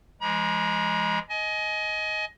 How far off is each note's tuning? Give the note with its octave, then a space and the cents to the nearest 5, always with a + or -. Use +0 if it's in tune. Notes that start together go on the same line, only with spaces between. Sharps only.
F3 -45 G#3 +0 A#5 +45
D#5 +15 G#5 +30